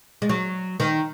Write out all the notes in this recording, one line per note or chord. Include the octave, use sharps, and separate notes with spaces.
G#3
F#3
D#3